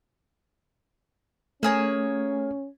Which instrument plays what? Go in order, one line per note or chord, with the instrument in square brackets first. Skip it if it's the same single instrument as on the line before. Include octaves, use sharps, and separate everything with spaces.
[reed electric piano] A3 [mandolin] A#3 G#4 C#5 [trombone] C#4